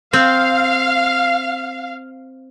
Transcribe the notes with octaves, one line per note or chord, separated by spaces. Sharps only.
C4 F5